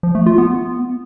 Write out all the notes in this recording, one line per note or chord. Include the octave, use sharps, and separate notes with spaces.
F3
A3
F4
B3